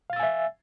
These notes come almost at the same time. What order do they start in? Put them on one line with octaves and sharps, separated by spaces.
F5 A6 E6 G#5 E5